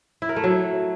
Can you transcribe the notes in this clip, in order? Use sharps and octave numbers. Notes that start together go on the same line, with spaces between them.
E4
A#4
A3
F#3